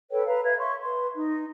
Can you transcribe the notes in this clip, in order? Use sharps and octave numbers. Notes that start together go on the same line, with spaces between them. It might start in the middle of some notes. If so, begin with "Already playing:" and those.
A4 B4 C#5 G5
B4 F5 A#5
B4 E5 F5 G#6
C#5 E5 C6 C#6
B4 C6
D#4